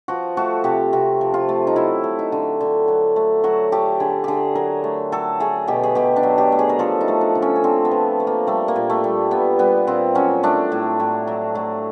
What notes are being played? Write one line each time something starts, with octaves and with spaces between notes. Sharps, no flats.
F3 F#4
A3 F#4
C3 G4
C3 F#4
F3
F4
A3
D#4
F#3 E4
A3
D#4
D3
D3
F#3
A3
F#3 F#4
A3 G4
D3 G#4
D3 G4 G#4
F#3 A#4
A3
F#3 A4
A3 G#4
B2 G4
G#4
B2 G4
D4
F#3
G4
A3
G#4
A#4
F3 A4
D#4
A3
D4
D3
C#4
C#4
D3 C4
B3
F3
A3
A#3
G3 A3
A#3
A#2
A3
G3
A#2 B3
G3 B3
A#2 C4
F#3 C#4
A3 D4
A2
A2
F#3
A3